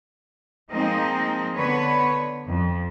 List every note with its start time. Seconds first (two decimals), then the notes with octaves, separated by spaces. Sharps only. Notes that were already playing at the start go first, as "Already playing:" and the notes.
0.71 F3 G#3 A#3 C4 D#4 D#5
1.55 D3 B3 B4 C#5
2.46 F2